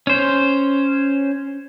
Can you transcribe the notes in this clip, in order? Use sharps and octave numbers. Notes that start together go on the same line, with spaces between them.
C#4 C5